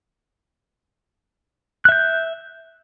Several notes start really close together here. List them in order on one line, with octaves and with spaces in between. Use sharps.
F#6 E5 G6